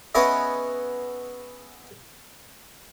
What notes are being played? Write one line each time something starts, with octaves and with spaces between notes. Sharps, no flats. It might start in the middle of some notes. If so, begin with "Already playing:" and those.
B3 C#4 E4 G#4 C#5 D#5